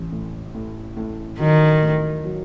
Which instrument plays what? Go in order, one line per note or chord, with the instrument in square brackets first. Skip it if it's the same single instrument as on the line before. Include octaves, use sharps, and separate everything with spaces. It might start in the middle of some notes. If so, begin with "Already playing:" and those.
Already playing: [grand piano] A1
A2
A2
A2
[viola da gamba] D#3 [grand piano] F#3
[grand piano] A2
F#3